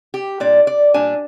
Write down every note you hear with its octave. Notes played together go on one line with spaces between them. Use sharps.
G4
A#2 G3 D4 D5
D5
A#2 G3 D4 G#5